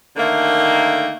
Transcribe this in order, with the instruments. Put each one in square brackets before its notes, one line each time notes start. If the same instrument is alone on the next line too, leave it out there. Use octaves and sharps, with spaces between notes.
[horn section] D3 D#3 A3 A#3